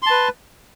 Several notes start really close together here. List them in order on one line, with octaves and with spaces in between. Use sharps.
C6 A5 B4